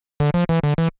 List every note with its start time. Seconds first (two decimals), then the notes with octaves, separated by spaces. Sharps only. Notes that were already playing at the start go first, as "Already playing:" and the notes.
0.20 D3
0.34 F3
0.49 E3
0.63 D3
0.78 E3